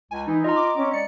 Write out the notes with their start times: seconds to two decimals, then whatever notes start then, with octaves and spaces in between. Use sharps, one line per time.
0.11 C#2 G#5
0.27 E3 D#4
0.44 F4 D#5 A#5
0.56 D6
0.76 C4 C#4
0.93 G#3 D5 C#7